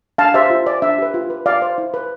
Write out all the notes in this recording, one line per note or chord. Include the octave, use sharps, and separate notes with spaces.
D4 F5 A5
G4 C5 E5
F4
C5 D5
D4 E5
G4 B4
F4
B4
F4 D5 F5
C5
E4
B4